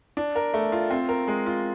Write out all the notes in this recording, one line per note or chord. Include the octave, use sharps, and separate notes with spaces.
D4
A#4
A3
F4
C4
A#4
G#3
F4